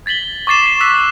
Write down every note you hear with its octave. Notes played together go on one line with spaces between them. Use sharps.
G#6 A6 B6 F#7 G7
C#6 D6 A6 C7 E7
B6 C7
E6 F#6 B6 E7